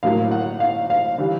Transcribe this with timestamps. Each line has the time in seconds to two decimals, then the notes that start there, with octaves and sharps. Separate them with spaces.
0.03 A2 F#3 A#3 F5
0.31 F#5
0.60 F5
0.90 F5
1.18 E3 G3